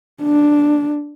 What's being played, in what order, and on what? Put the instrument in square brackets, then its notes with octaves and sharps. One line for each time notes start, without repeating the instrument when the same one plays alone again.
[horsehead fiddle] D4